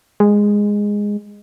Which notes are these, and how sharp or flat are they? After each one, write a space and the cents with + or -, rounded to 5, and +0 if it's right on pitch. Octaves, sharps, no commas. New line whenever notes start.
G#3 -10